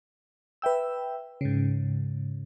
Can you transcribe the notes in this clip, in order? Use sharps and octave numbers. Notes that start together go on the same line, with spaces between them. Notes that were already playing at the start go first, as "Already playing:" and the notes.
B4 E5 G5 E6
G#2 C#3